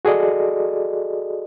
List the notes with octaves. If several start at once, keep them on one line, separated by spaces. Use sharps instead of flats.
F#4 G#4 A4 D5 D#5